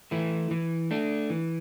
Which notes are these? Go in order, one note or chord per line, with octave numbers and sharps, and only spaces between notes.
E3 A3 E4
E3
A3 D4
E3